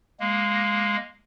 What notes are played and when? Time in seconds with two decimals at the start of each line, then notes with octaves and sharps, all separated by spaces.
0.20 G#3 A#3